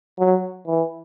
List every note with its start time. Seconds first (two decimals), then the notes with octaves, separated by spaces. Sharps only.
0.19 F#3
0.67 E3